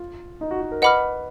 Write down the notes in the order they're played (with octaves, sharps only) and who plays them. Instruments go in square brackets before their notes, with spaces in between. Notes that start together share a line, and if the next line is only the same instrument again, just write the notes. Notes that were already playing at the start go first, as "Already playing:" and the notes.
Already playing: [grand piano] F4
D#4
F#4
F#4
A#4
[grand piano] B4 [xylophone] D#5 F#5 B5 D6 F6